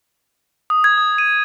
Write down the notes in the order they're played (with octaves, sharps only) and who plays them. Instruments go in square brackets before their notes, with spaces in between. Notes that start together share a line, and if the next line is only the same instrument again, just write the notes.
[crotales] D#6
G#6
D#6
D#7